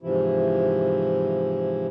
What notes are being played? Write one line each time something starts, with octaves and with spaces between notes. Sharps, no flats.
G#2 C3 E3 F3 E4